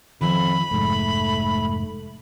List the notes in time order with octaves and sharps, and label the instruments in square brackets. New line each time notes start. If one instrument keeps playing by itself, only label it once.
[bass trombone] F2 [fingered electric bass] D#3 F3 [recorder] B5
[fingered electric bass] F1 G#2 [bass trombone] A3